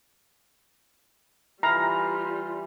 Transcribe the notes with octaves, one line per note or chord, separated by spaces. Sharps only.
E3 G3 F4 A#5 B5 F6